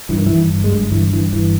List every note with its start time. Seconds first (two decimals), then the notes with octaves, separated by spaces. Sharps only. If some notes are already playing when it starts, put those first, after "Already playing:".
0.09 G2 E3
0.18 D#3
0.26 G2 E3
0.50 G1
0.64 G#3
0.71 G1 G3
0.92 G2 E3
1.12 G2 E3
1.33 G1 E3